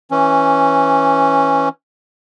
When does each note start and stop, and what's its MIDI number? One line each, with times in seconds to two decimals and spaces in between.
0.11 1.69 52
0.11 1.69 61